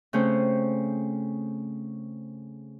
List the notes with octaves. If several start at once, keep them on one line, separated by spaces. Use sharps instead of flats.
C#3 A3 C4 C#4 C5